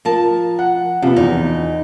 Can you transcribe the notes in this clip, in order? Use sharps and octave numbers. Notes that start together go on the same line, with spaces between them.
F3 A#4 A5
F#5
C3 F3 B3
E2 D#4